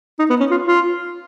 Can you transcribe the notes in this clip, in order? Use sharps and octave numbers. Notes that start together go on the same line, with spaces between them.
D#4
B3
C#4
F4
F4